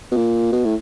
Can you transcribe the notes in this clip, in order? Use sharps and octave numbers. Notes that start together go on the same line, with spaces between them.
B2
A#2
B2
A2